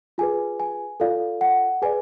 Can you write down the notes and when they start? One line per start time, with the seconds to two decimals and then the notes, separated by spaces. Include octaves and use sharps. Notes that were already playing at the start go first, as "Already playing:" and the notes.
0.18 F4 G#4 B4 G#5
0.60 G#5
1.00 F4 A4 D5 F5
1.41 F#5
1.82 G#4 B4 D5 G#5